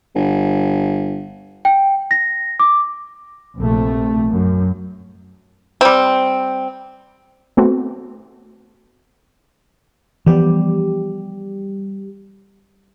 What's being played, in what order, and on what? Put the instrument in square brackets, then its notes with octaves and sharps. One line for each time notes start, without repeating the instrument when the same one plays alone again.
[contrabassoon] G1
[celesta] G5
A#6
D6
[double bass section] A#1 C3 A3
F#2
[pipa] G3 C4
[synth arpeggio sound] A3 B3 C4 F#4 A4
[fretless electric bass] E3 F3 B3 [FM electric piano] G3 G4